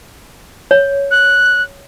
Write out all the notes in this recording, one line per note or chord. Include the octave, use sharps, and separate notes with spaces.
C#5
F#6